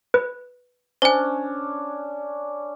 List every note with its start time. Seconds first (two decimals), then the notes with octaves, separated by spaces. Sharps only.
0.14 B4
1.02 C#4 D4 C5 G#5